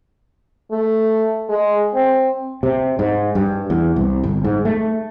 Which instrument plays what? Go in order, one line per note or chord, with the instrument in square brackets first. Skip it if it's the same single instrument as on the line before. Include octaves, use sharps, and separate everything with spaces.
[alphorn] A3
G#3
C4
[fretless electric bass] C3
G#2
G2
E2
C2
G1
G#2
A3